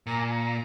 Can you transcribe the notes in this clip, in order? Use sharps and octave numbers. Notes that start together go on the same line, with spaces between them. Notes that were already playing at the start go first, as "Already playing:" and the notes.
A#2 A#5
G#5
A#5